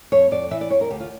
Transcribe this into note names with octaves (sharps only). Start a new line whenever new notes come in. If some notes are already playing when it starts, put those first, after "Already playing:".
F2 C#5
F2 D5
E3 E5
D5
F2 C#5
A#4
D2 G4
F4